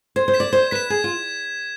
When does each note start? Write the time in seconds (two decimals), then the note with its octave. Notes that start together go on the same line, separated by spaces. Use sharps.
0.16 C5 G#6
0.28 C5
0.34 B6 E7
0.40 D5
0.52 C5 G#6
0.71 B4 B6 E7
0.90 G#4 G#6
1.04 F4